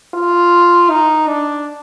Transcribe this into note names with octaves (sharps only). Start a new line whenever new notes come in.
F4
D#4
D4